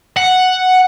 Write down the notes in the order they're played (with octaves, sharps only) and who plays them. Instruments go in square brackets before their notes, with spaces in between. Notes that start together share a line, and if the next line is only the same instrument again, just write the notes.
[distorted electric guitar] F#5